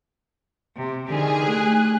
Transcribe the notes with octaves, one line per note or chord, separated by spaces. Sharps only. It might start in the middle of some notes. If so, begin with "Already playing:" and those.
C3
D3 D#3 G4 G#4
A3 F#6